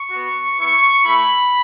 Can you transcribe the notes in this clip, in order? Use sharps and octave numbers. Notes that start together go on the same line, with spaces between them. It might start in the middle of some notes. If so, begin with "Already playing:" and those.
Already playing: C#6
B3 F#4
B3 E4 C#6
A3 E4 B5